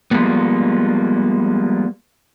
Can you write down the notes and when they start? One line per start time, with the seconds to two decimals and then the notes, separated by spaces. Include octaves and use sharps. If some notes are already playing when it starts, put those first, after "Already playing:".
0.11 F3 G3 G#3 A#3 B3